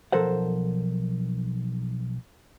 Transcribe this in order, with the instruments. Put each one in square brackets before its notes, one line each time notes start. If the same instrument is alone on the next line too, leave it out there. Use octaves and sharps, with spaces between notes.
[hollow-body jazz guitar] B1 F3 A4 A#4 C5 F#5